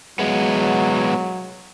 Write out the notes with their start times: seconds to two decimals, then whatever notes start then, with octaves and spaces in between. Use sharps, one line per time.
0.19 F#3 G#3 B3